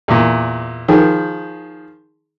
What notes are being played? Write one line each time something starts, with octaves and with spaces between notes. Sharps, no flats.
E2 A#2
D#3 F3 G#4